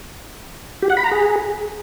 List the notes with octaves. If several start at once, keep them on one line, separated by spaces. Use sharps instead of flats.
G4
F#5
B5
A#5
G#4